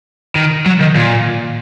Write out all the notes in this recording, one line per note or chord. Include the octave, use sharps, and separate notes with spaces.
D#3
F#3
D#3
A#2